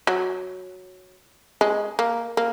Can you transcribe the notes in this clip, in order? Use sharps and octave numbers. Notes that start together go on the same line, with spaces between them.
F#3
G#3
A#3
A#3